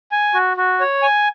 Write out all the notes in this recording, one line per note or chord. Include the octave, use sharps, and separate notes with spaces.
G#5
F#4
F#4
C#5
G#5